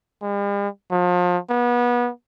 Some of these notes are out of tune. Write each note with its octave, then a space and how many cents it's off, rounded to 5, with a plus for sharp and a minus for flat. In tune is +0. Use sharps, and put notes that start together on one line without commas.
G3 +45
F3 +35
B3 -30